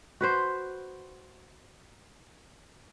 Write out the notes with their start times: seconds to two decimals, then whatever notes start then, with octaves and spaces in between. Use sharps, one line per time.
0.21 F#4 B4 C5